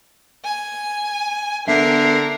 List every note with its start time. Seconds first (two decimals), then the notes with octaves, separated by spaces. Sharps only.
0.44 G#5
1.68 D3 B3 A#4 E5 C7